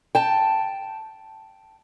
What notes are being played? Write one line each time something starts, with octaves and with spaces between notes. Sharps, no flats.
G5 A5